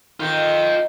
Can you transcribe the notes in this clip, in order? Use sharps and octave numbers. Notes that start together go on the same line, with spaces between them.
D#3 F4 G5